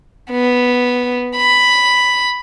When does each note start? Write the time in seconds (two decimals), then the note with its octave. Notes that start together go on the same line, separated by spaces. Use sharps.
0.31 B3
1.36 B5